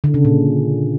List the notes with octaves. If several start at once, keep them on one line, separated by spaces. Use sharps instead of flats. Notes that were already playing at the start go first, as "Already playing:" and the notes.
D3
C#3
A#2